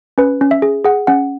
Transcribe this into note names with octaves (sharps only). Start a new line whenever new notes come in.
C#4 B4
C#4
E5
G#4
G#4 F#5
C#4 F#5